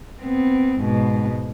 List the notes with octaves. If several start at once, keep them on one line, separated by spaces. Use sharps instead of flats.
B3 C4
G#2 B2